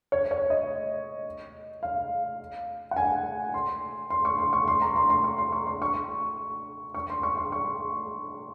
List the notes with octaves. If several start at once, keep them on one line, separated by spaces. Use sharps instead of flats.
C#5
C#5
D#5
F5
F#5
G#5
C6
C6
C#6
C6
C#6
C6
A#5
C6
C6
C#6
C6
C#6
C6
C#6
C#6
C6
C#6
C6
C#6